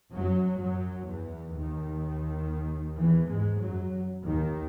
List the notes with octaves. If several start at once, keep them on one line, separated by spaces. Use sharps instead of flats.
F#2 F#3
F#2 F#3
E2 E3
D#2 D#3
E2 E3
G#2 G#3
F#2 F#3
D#2 D#3